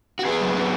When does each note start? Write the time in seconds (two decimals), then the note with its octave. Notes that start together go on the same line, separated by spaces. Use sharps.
0.19 F#4
0.25 B3 G#4
0.40 F#3
0.56 B3